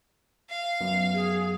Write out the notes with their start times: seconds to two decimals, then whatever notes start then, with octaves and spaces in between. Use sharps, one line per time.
0.50 F5
0.81 F#2 B3
1.13 G#4